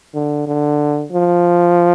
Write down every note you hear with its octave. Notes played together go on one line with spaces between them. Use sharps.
D3
D3
F3